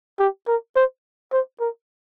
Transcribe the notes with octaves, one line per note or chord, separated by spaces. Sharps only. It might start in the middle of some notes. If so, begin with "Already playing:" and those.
G4
A#4
C5
C5
A#4